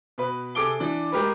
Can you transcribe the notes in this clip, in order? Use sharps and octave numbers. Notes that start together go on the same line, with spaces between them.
B2 B4
C3 G#4 A4 D6 D7 G7
E3 D4
G#3 G4 A#4 B4